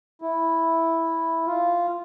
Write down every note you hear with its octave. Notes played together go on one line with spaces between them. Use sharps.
E4
F4